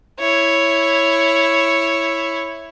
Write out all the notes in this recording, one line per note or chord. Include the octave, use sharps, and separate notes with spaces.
E4 C#5